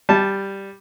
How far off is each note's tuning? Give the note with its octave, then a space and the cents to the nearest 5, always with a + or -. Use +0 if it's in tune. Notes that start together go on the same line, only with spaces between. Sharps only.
G3 +0 A5 -10